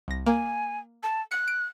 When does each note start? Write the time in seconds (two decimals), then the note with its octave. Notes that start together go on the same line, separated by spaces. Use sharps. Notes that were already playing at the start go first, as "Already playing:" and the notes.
0.08 C2 A#6
0.27 A#3 G#5
1.03 A5
1.31 F#6 C#7
1.48 D7